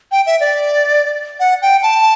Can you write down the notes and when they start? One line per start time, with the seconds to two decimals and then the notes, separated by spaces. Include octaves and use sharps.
0.12 G5
0.26 E5
0.40 D5
1.40 F#5
1.62 G5
1.83 A5